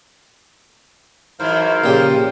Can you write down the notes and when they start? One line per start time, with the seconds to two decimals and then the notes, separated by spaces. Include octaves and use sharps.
1.40 G#2 E3 F#3 A#4 C5 F5
1.84 A#2 C#3 F3 G4